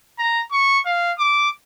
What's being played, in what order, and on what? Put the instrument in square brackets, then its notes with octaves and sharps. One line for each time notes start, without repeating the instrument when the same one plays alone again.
[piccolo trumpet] A#5
C#6
F5
D6